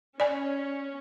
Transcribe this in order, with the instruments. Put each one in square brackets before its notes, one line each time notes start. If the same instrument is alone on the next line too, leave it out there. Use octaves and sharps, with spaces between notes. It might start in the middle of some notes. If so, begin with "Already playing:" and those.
[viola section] C#4 [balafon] D5 G#5